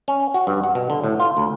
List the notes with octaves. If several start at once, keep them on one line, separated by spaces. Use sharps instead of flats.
C#4
F#4
G2
F#5
B2
D3
A2
F4
D2